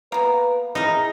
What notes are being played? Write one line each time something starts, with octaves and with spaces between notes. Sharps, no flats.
A#3 B3 B4 A#5
D#4 E4 G#4 A#4